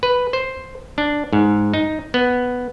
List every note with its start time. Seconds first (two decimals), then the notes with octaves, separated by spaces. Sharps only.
0.03 B4
0.33 C5
0.98 D4
1.33 G#2
1.74 D#4
2.14 B3